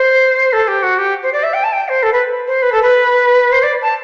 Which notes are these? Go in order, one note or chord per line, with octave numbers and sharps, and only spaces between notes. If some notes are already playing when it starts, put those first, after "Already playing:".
Already playing: C5
A4
G4
F#4
G4
C5
D5
E5
G5
A5
G5
C5
A4
B4
C5
B4
A4
B4
C5
D5
A5